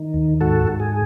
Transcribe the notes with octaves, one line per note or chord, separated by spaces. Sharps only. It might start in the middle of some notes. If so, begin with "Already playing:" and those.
Already playing: D#3
D#2
G#2 F#4 A4
G#2
G#4